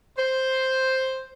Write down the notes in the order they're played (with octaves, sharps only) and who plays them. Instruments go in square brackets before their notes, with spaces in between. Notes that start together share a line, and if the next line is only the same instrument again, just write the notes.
[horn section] C5